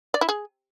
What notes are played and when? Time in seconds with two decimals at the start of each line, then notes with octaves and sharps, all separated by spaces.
0.14 D5
0.21 E4
0.29 G#4